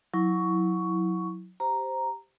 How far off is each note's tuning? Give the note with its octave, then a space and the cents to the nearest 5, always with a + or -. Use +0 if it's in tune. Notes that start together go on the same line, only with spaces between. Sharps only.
F#3 -20 E4 -15 C#6 +10
G4 +0 C5 +0 A#5 +0